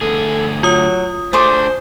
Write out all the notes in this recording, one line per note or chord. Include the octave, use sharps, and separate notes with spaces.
D2 G#4 A4
F#3 F4 D#6
A3 D4 G#4 C5 C6 D6